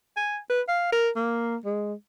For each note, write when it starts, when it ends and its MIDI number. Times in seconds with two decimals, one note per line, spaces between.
0.17 0.38 80
0.50 0.62 71
0.69 0.88 77
0.92 1.09 70
1.16 1.56 58
1.65 1.94 56